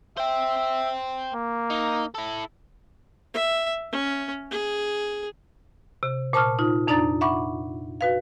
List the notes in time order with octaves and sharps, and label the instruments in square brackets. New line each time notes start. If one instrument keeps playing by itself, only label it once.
[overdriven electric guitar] C5 G5 [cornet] E5
[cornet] A#3
[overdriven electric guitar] D#4
E4 A4
[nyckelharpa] E5
C#4
G#4
[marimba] C3
A#2 C5 A5 C#6 D#6 F6
D#4 F4
F2 D4 D#4 D5 A#5 A6
E5 F#5 B5 C#6 D6
F#4 B4 F5